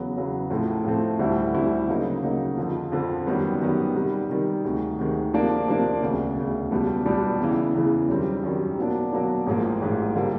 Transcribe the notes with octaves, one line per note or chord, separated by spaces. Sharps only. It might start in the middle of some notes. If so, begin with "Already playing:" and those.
Already playing: E2 C#3 F#3 B3
E2 C#3 F#3 B3
A2 F3 A3 C4
A2 F3 A3 C4
D2 D3 G3 C4 E4
D2 D3 G3 C4 E4
C#3 F#3 A#3 D#4
C#3 F#3 A#3 D#4
F2 D3 F3
F2 D3 F3
F#2 D#3 G3 B3
F#2 D#3 G3 B3
C3 D#3 G3
C3 D#3 G3
D2 C3 D#3 G#3
D2 C3 D#3 G#3
C3 F3 A#3 D4
C3 F3 A#3 D4
E1 D2 C#3
E1 D2 C#3
C#2 B2 G3 B3 D4
C#2 B2 G3 B3 D4
E2 C#3 E3
E2 C#3 E3
F#2 D#3 G3 C4
F#2 D#3 G3 C4
B2 F#3 A#3 D4
B2 F#3 A#3 D4
A1 G#2 F3 A#3
A1 G#2 F3 A#3
D3 G3 A#3